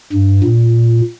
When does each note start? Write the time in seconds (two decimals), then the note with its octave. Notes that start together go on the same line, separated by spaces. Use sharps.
0.13 G2
0.44 A#2